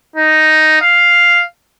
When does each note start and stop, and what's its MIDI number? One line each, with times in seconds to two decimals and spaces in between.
0.16 0.79 63
0.82 1.43 77